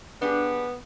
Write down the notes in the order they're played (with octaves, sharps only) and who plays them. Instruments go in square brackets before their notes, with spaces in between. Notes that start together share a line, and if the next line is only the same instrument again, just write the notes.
[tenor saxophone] B3 [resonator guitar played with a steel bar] D4 G4 G#4